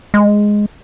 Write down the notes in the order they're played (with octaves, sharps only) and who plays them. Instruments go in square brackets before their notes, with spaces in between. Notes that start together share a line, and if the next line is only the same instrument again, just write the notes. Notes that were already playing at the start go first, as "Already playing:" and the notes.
[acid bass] G#3